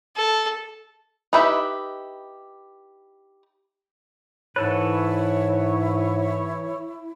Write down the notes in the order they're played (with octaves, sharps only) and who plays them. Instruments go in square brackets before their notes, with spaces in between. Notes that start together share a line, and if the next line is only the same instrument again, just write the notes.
[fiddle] A4
[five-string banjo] D#4 E4 G4 B4 E5
[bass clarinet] G#2 [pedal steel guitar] E3 A4 B4 [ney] E4 [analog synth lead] C#5